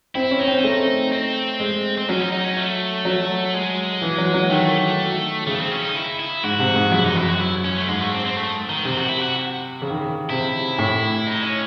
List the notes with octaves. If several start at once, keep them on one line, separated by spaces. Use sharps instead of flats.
C4 E4
C#4
D#4
C4
A3
C4
G#3
C4
F#3 C#4
D#4
D#4
C#4
A3
F#3
G#3
E3
F#3
F#3
D#3 A3
C#3 A3
C4
C#4
D#4
E4
E4
G#2 F#4
C3
G#2
F#2 E4
D#4
F#2 E4
F#4
E4
C#4
A3
G#2 G#3
A3
C4
C4
A3
D#3
C3 C4
F#4
E4
F#4
C#3
D#3
C#3
C3 E4
A2
D#4
C#4